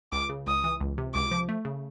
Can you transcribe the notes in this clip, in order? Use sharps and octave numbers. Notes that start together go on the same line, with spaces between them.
C#2 D6
C#3
C#2 D#6
E3
C#2
C3
C#2 D6
F3
A3
C#3